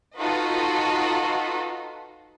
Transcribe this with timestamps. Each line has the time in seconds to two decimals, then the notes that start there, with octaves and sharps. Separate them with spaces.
0.17 D#4 F4 F#4 A4 B4 D#5